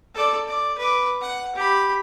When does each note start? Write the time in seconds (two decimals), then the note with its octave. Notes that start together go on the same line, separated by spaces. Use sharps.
0.15 A4 D5
0.47 D5
0.78 B4 D6
1.21 F#5
1.55 G4 B5